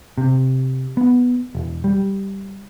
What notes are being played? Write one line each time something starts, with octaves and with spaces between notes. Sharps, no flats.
C3
B3
E1
G3